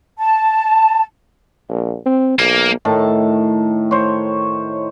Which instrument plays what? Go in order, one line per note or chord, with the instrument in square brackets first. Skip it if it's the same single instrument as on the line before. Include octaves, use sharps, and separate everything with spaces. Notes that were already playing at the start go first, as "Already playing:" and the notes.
[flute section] A5
[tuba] A#1
C4
[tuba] B1 [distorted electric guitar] A#3
[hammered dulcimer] A2 D#3 A5
C5 C#5